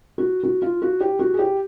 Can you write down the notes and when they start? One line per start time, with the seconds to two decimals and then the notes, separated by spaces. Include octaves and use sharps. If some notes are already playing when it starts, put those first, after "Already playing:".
0.18 F#4
0.43 F#4
0.62 F4
0.82 F#4
1.01 G4
1.19 F#4
1.34 G#4
1.39 G4